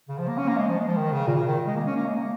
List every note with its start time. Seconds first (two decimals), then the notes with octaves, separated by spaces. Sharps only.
0.08 C#3
0.18 F3
0.28 A#3
0.38 C#4
0.48 A#3
0.58 G#3
0.68 F3
0.78 G#3
0.88 F3
0.97 D#3
1.12 C#3
1.27 A#2
1.37 C#3
1.47 D#3
1.67 G#3
1.76 A#3
1.87 C#4
1.96 A#3
2.06 G#3
2.16 A#3